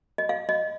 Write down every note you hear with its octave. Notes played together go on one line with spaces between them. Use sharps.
D#5
F5
D#5